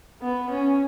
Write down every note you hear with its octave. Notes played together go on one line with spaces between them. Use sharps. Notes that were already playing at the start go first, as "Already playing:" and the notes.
B3
C#4